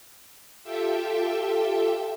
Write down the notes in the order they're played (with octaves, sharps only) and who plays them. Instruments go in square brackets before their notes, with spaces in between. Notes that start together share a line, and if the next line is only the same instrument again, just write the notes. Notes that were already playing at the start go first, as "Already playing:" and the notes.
[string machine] F4 G4 A4 E5 G5